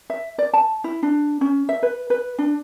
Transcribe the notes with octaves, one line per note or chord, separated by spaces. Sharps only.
E5
D5
A5
E4
D4
C#4
E5
B4
B4
D4